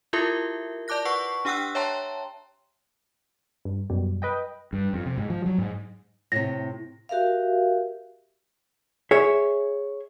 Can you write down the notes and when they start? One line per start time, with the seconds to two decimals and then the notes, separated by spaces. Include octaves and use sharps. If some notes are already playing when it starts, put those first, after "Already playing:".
0.13 E4 F4 G4 A4 A#4 E5
0.88 D5 A5 D6 F#6 A#6
1.05 B4 F#5 C#6 C7
1.45 D4 G4 F#5 G5 E6 F#6
1.75 C#5 E5 G5 A5 A#5 C6
3.65 G2
3.90 F#2 B2 G3
4.22 B4 D#5 G5
4.73 G2
4.93 F2
5.06 C3
5.18 G#2
5.30 F3
5.46 F#3
5.58 G#2
6.32 A2 C3 A#6
7.09 F#4 G4 A#4 E5 F5
9.11 G#4 C#5 E5